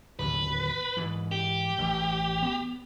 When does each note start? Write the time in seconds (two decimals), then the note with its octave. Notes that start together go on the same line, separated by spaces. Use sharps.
0.19 D1 D#2 B4
0.97 G#2 E3
1.32 G4
1.78 A1
2.43 B3